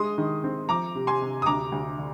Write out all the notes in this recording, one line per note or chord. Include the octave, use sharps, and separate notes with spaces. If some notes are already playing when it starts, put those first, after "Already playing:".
Already playing: G#3 C6 D#6
D#3
C4
F3 A#5 D6
C3
G#5 C6
C3
D#6
D2 A#5 D6
D2
D3